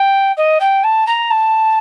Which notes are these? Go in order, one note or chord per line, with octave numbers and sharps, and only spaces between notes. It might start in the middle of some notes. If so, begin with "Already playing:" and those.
Already playing: G5
D#5
G5
A5
A#5
A5